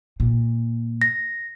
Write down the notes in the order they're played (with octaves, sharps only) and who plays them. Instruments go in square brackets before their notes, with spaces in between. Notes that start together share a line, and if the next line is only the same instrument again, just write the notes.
[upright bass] A#2
[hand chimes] A#6